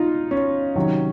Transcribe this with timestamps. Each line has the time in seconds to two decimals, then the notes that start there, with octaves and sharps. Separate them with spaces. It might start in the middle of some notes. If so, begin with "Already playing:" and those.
Already playing: D#4 F4
0.31 C#4
0.76 C3 D#3 F#3